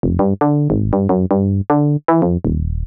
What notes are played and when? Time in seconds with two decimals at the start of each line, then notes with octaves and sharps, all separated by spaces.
0.03 F1
0.19 G2
0.41 D3
0.70 G#1
0.93 G2
1.09 F#2
1.31 G2
1.70 D3
2.08 E3
2.22 F2
2.45 D#1